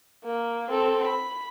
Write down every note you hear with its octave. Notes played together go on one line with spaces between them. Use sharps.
A#3
C4 A4
B5